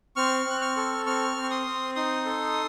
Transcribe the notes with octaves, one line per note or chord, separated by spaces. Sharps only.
C4 C#6 F6
C4 F#6
C#6 F6
A4
C4 C#6 F6
C4
C#6
C6 D#6
C4
D#4 C6 D#6
A4